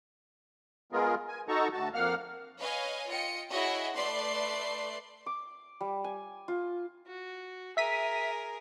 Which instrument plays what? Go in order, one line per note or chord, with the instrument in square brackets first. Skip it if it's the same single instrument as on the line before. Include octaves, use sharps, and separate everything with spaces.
[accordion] G#3 B3 F4 G#4 A#4
G#5
D#4 F#4 A4 A5 A#5 C#6
D2 F#4 A5
F2 A#3 F5 F#5 F6
[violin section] B4 C#5 D#5 F5 G#5
F4 D#5 G5 C#7
E4 F#4 G#4 C#5 D#5 E5
A3 B4 D5 C6 C7
[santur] D6
G3
G#5
F4
[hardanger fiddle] F#4
[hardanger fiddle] G#4 A#4 [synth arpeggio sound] E5 B6 D#7